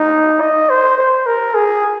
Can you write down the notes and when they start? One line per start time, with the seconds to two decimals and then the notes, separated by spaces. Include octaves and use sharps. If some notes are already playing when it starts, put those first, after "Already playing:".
Already playing: D#4
0.41 D#5
0.70 C5
0.98 C5
1.26 A#4
1.54 G#4